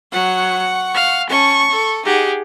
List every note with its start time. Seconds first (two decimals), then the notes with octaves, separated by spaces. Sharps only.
0.13 F#3 F#5 C#6
0.94 F5
1.29 C#4 A5 C#6
1.71 A4
2.05 D#4 G4 G#4 F#5